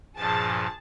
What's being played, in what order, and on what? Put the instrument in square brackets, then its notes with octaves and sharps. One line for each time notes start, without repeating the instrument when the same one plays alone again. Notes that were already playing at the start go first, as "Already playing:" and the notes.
[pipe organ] G2 A#2 F3 [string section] G#4 A5